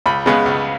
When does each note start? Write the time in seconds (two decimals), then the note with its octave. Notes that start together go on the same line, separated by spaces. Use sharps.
0.06 C#2 B5
0.26 C#3 G#3 B3
0.46 C#2